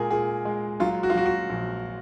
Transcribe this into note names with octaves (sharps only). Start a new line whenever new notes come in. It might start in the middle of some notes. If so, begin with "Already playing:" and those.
Already playing: A#2 G#3 G#4 A#4
A#2 G#4
G#3
F#3 F4
F#4
F4
F#3 F#4
F#4
A#1